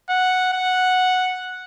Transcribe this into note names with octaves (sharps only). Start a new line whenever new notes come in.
F#5
F#5